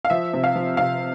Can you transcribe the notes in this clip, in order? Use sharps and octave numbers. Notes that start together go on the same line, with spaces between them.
F5
F3 E5
C3
F5
F3
C3 F5